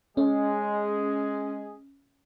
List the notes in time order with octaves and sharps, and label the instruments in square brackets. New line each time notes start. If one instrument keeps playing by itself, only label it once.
[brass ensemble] G#3 G#4 [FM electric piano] C#4